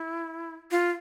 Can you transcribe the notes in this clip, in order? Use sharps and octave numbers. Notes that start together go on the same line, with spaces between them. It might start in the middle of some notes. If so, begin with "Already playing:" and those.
Already playing: E4
F4